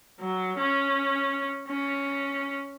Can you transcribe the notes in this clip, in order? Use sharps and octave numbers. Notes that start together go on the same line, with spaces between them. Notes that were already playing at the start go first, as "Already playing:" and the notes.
F#3
C#4
C#4